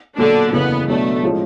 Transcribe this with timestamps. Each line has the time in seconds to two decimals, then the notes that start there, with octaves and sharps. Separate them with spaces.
0.17 B1 A#2 D3 F#3 D4
0.52 F#1 E2 C#3 E3 B3
0.87 B2 F#3 A3 B3 D4
1.23 A2 F3 G#3 C#4